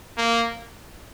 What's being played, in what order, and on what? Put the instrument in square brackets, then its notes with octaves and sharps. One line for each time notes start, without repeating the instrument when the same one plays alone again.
[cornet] A#3